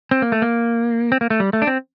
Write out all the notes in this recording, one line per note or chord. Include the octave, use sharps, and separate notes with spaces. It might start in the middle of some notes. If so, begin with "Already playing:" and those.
C4
A#3
A3
A#3
C4
A#3
A3
G3
A3
D4
C4